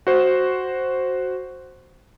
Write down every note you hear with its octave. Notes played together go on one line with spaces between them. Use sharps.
F#4 C5